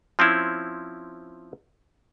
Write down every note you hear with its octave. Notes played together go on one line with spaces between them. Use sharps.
F3 C4 C#4 E4